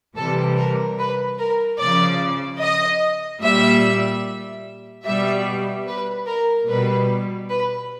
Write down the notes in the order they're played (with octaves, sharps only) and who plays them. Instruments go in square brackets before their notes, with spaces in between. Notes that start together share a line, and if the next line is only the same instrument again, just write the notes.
[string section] C3 E3 G3 A4
A#4
B4
A#4
C#3 F3 D5
D#5
A#2 G3 E5
B2 G3 E5
B4
A#4
B2 G3 B4
B4